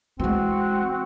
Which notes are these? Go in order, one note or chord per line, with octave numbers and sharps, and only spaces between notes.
E3 G#3 C4 F#4